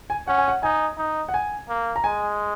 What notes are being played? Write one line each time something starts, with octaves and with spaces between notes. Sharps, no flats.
G#5
C#4 F#5
G#5
F#5
D#4 G#5
D#4
F#5
G#5
A#3
A#5
G#3 G#5